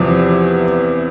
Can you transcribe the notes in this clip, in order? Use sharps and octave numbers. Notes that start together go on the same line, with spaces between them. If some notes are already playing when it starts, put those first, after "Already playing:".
Already playing: E2 C3 E3 F3 B3